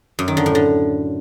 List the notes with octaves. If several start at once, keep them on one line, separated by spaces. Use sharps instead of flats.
F#2
D#3
D3
A2
D3